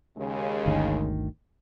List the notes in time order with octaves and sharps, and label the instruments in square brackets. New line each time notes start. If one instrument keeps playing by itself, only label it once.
[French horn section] D#2 C#3 G#3
[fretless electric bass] G1 D2 D#3